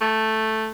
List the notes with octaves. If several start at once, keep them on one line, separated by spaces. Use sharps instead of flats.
A3